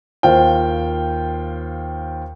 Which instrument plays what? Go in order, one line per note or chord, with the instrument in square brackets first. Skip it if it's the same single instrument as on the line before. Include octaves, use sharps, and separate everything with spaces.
[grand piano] D#2 F4 C5 G5